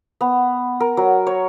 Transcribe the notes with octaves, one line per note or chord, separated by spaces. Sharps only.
B3
A#4
F#3
C#5